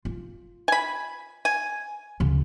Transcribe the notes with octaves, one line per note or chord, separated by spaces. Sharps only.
F4
G#5 B5
G#5
D2 C#3